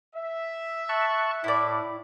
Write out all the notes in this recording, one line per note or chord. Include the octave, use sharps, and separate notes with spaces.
E5
A5 C#6 F#6
A2 E4 D5